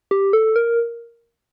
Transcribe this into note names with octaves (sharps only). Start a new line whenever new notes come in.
G4
A4
A#4